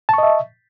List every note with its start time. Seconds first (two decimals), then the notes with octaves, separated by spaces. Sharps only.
0.09 A5
0.14 C#6
0.18 D#5
0.23 E5